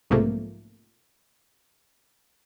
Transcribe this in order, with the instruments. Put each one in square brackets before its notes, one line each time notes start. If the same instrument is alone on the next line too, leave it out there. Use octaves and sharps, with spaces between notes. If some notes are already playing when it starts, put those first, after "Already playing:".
[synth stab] B1 G#2 C3 F3 A3 A#3